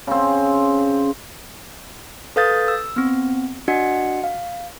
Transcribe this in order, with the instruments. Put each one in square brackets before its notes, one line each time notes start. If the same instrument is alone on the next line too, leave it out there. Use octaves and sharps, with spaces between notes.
[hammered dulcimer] C#3 C4
[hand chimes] A4 B4 F5 D#6 G6 A6
E6
B3 C4
D4 F#4 D#5 F#5 C#7
F5